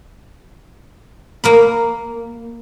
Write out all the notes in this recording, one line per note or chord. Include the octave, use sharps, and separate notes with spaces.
A#3 A#4 B5